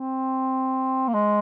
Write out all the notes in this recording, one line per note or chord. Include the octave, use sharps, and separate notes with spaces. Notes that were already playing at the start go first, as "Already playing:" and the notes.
Already playing: C4
A#3
G#3